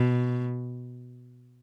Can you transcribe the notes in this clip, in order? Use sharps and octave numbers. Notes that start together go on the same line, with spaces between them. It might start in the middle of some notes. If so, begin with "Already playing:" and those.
Already playing: B2